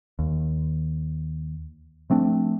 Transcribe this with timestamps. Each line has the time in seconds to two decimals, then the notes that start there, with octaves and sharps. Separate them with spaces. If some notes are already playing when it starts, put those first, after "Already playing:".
0.19 D#2
2.10 F3 A3 C4 D4